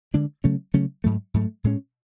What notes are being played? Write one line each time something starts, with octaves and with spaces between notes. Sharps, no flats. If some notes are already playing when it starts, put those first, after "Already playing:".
D3 G#3 D4
C#3 F#3 A3 C#4
C#3 F#3 A3 C#4
G#2 F#3 A3
G#2 F#3 A3
A2 G#3 C#4